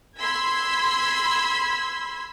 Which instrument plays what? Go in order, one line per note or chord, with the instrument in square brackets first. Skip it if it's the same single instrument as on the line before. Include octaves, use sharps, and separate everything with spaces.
[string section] B5 C6 E6 G#6 B6